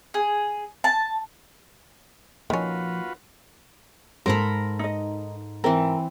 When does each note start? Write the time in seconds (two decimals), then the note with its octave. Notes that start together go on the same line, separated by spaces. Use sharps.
0.14 G#4
0.84 A5
2.50 D#3 F3 A#3 C#4 F4 F#4 B4
4.26 G#2 A4 A#4 C5 A#5 B5
4.79 D#4 D#5
5.64 E3 C4 A#4